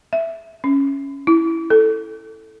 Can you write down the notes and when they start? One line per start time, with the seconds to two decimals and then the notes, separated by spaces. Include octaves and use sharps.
0.13 E5
0.64 C#4
1.27 E4
1.70 A4